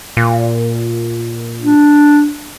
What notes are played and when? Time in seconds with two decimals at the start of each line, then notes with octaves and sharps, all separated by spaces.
0.17 A#2
1.62 D4